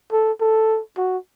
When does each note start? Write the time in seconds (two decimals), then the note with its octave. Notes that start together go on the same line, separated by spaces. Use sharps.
0.12 A4
0.41 A4
0.97 F#4